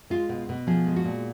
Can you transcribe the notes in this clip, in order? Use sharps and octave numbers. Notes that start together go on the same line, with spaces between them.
G#3 F4
B2
B2
F3 G#4
G#3
F#4
A#2